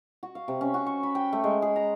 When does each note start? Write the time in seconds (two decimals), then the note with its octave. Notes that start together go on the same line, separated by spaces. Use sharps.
0.23 F#4
0.35 F5
0.48 C3
0.61 C#4
0.74 F#4
0.86 C#6
1.03 B5
1.15 G5
1.33 A3
1.44 G#3
1.62 G#4
1.76 A#5